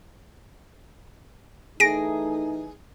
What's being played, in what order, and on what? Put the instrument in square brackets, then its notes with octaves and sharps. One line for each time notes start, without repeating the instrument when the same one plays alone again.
[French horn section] E3 A3 D#4 [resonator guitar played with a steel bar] G#4 [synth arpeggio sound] A#6 D7